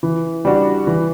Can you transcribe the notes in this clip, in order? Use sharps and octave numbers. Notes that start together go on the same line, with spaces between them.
E3
G3 D4 F#4
E3